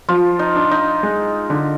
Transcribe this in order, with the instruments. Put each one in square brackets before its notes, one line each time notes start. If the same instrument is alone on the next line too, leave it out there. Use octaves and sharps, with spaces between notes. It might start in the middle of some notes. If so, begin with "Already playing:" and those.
[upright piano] F3 [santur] F4
[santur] D#4
[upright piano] D4
[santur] D#4
[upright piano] G#3
D3